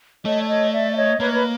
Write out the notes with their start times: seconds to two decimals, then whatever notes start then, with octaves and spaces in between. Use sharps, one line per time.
0.25 A3 C#5 D#5
0.41 D5
0.48 C#5 D#5
0.72 D5 E5
0.91 E5
0.95 C#5 D#5
1.20 A#3 B4 C#5
1.33 B4